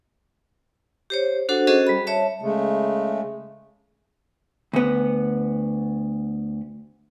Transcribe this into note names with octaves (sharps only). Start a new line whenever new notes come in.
G4 C5 C#5
D4 F#4 A4 C5 F#5
C#4 F#4 G#4 A4 C5 D#5
G3 B5
C#5 E5 A5
C#3 G#3 A3
D2 B3